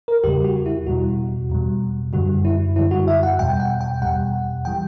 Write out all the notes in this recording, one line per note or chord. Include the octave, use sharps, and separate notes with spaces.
A#4
E2 C#3 G3 G4
F#4
E4
E2 B2 G3 F#4
E2 B2 G3
F#2 D3 G3 F#4
E4
F#2 D3 G3 E4
F#4
E5
F#5
E2 B2 G3 G5
F#5
G5
E2 B2 G3 F#5
E3 G3 G5